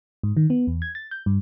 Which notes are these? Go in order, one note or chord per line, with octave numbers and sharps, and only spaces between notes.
G#2
D#3
B3
E2
G#6
A6
G6
G2